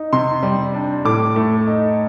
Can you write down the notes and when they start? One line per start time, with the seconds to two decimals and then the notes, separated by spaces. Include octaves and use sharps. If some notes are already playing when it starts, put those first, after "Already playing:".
Already playing: D#4
0.13 C3 C6
0.43 G3
0.74 D4
1.05 A2 D6
1.36 A3
1.67 D#4